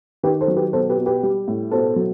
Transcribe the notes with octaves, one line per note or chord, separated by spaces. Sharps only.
D#3 G4 B4
A4 C5
F#3
G4 B4
B2 A4 C5
G4 B4
B2
G4 B4
G3
A2
B2 A4 C5
F#3